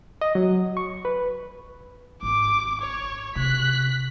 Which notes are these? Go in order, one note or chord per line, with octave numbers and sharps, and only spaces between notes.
D#5
F#3
C#6
B4
G#1 D6
C#5
C3 F#6 B6